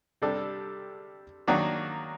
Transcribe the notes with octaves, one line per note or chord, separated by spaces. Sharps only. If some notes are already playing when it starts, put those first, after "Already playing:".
C3 G3 D4 A4
D#3 F#3 A#3 D4 F#4